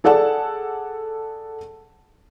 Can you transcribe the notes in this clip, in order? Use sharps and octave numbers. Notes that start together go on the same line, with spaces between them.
G#4 A4 D5 F#5 A5